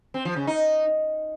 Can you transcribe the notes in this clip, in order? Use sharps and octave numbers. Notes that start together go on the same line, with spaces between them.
C4
F3
C#3
D#4